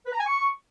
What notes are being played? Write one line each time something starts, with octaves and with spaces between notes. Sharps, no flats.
B4
A#5
G#5
C#6